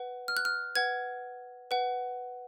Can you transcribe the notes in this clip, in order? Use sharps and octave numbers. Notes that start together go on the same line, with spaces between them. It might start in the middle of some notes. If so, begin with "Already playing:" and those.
Already playing: B4 F#5
F6
F#6
F6
B4 F#5 G#6
B4 F#5